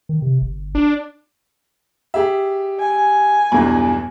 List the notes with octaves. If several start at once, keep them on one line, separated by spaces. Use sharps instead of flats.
D#3
C3
G1
D4
G4 G#4 E5
G#5
B1 E2 G2